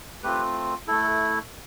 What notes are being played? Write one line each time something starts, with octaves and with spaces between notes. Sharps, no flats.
A3 C4 F4 G4 B4
A3 E4 A4